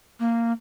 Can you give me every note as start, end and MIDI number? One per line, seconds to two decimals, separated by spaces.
0.20 0.52 58